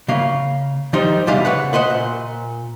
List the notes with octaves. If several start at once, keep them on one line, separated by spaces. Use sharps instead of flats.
C#3 A#3 F5
D#3 F3 G3 D#4 C5
E2 C3 G3 G#4 D#5 F5
C#3 B4 F#5
B4 C5 D#5 F#5
A#2